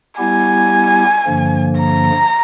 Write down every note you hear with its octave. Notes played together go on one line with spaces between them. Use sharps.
G3 B3 E4 G4 G#5
G2 D3 F3 A#3
A#5